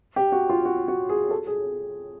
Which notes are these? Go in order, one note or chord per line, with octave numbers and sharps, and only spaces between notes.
G4
F#4
F4
F#4
F#4
G#4
A4
G#4